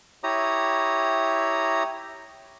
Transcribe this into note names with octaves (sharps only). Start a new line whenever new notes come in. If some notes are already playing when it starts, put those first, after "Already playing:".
E4 G4 C#5 A#5 D#6